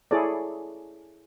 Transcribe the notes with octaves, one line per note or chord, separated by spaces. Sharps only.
E4 G#4 A4 C#5 D5